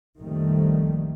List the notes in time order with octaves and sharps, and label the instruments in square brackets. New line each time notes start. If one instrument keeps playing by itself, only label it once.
[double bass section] A#1 F2 D#3 G3 A3